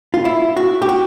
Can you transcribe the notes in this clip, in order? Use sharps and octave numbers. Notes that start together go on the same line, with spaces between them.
F4
E4
F#4
G4
F#4